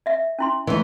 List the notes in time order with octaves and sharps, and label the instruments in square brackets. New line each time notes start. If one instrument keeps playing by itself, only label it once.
[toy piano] D#5 E5
C#4 E4 C6
[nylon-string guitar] D2 E3 [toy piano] D#5